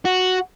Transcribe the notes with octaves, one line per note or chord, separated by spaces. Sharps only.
F#4